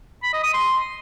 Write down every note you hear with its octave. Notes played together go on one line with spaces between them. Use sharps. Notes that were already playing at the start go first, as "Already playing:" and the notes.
B5
D#5
D#6
C6